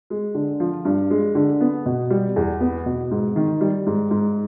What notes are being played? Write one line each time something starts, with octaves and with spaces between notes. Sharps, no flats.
G#3
D3
F3
G2
G#3
D3
B3
B2
G3
E2
B3
B2
G#2
D#3
G3
G#2
G#2